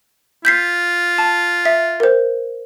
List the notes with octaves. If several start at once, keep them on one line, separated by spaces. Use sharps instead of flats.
F4 G6 B6 C7
A5
E5
A#4 C5